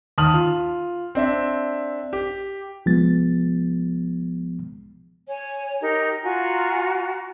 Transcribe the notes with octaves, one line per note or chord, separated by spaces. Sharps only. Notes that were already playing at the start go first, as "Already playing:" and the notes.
D#2 A5 D#6 F6 F#7
F4
C4 D4 E5
G4
C2 F3 G#3 B3 A6
C#5 G#5
D#4 G4 A#4
F4 F#4 G#5 A#5